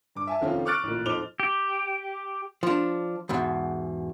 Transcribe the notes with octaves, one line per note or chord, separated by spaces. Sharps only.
G2 D6
E5 G#5 A5
F1 D#3 C4 C#4 F4
C#6 D6 F6 F#6 A6 D7
A1 A#2
F2 D#4 C5 D6 F7 G7
G4
F3 D4
E2 G#2 B2